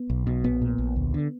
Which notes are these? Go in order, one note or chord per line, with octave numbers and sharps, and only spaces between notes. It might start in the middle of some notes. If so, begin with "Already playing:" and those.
Already playing: B3
B1
B2
A#1 B3
A#2
A#1
D2
D3